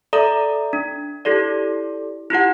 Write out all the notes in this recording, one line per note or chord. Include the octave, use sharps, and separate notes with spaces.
A4 D5 E5 A#5 D#6
D4
E4 G4 A4 D5
E4 F4 G4 F#5